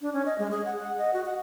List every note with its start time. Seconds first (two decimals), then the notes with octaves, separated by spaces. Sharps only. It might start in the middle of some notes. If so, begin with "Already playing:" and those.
0.01 D4
0.13 C#4
0.26 D#5
0.38 G#3
0.51 G#4
0.66 F#5
0.79 F#5
0.98 D#5
1.14 F#4
1.26 F#5